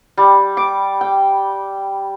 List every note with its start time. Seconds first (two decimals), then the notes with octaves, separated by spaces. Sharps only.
0.17 G3
0.57 D6
1.01 G5